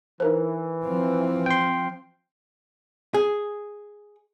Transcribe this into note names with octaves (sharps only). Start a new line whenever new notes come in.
E3 D#4 A#4 C5
F3 C4
G5 C6
G#4